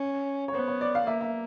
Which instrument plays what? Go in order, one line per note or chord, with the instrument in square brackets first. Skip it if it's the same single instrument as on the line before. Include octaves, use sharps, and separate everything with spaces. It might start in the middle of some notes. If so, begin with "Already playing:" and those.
Already playing: [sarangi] C#4
[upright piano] C#5
[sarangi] B3 [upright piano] C5
[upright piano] C#5
D5
F5
[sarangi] A#3 [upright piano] E5
[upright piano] E5